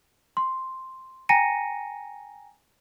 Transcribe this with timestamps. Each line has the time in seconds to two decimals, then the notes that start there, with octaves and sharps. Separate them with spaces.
0.37 C6
1.29 G5 G#5 A#5 A#6 C#7 D#7